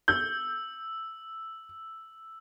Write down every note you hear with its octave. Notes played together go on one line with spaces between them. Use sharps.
E6 G6